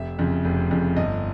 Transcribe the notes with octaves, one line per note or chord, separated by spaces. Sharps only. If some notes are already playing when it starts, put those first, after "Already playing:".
Already playing: F1 E5
F2 C#3
F1
F2 C#3
G1 D#5